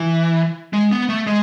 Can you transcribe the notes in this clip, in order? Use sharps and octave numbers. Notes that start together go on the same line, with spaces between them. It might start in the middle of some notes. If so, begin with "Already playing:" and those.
Already playing: E3
G#3
B3
A3
G#3